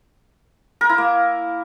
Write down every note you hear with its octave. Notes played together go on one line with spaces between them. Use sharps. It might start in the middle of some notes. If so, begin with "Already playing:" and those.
A#4
E4
A#3